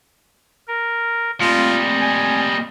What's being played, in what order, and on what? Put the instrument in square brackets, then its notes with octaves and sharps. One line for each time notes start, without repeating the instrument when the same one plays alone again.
[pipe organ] A#4
[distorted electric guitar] A#2 G3 [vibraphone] A3 C4 [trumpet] F4 [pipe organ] D#5
[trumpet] G#5